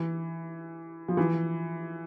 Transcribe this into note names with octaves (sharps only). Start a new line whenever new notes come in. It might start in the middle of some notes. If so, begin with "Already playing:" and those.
Already playing: E3
F3
E3